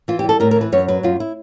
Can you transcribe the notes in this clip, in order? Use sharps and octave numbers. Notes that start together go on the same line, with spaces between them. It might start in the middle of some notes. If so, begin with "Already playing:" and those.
E3 F4
G4
G3
A4
A2 A#4
A#4
E3
B4
F#2 C#5
F#3 B4
F#2 F4
E4